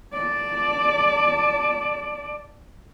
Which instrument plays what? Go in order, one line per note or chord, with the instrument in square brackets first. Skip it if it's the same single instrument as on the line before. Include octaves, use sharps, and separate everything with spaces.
[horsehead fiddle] D5 A5